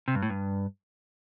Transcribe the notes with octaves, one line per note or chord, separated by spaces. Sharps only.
C3
G2
A2
G2